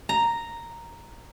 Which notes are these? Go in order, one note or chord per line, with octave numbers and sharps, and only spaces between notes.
A#5